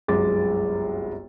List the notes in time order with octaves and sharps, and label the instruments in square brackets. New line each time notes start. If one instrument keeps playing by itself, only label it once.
[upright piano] G1 C2 F#2 G#3 D6 A6